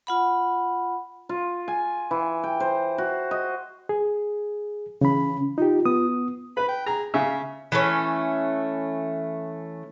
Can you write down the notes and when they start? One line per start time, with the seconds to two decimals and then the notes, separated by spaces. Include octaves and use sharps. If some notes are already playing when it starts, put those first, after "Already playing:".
0.07 F4 F#5 B5
1.29 F4
1.68 G#5
2.11 E3
2.44 G5
2.60 C5
2.98 F#4
3.31 D#5
3.89 G#4
5.01 C#3 E3 C#4 B5
5.58 D#4 F4 G4
5.85 B3 D#6
6.57 B4 B5
6.69 G5
6.86 G#4 A#5
7.14 C#3 E5
7.72 E3 A3 C#4